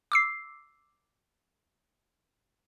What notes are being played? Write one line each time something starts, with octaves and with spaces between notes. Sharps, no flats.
D6 E6 C7